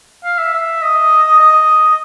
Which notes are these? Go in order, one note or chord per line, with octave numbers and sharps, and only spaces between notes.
F5
E5
E5
D#5
D#5